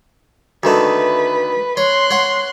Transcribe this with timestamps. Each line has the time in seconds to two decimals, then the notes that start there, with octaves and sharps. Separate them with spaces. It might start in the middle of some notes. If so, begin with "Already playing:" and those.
0.63 D2 D#3 A3 B4
1.77 C#5 C6 F#6
2.11 C#5 F#5